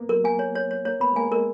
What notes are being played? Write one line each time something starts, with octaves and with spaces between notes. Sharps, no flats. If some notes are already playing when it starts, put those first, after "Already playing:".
Already playing: A#3 B3
F#3 A#4
A#3 G#5
C#5
C#5
C#5
A#3 C#5
B3 B5
G#3
A#3 G#5
G#3 A#4